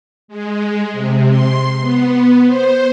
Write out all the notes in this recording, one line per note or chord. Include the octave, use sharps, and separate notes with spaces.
G#3
C3
C6
B3
C5